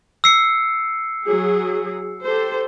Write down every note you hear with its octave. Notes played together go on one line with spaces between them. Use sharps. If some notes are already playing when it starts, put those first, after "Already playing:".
E6 C7 C#7
F#3 G#4
G4 A4 C5